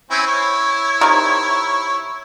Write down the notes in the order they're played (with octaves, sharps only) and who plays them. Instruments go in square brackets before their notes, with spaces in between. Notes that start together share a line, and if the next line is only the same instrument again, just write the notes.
[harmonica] C4 C#4 E4
E4 C#5
[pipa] C3 D#3